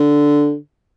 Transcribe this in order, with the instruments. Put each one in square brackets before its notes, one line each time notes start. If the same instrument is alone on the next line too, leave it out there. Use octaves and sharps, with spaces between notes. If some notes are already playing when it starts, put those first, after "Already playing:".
Already playing: [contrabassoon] D3